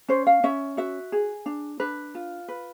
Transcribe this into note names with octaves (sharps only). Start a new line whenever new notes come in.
C#4 C5
F5
C#4 E5
F#4 E5
G#4
D4
D4 B4
F4
B4